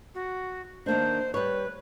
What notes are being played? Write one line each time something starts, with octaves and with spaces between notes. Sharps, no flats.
F#4
D#3 A#3 D4 C5
G3 B4 C#5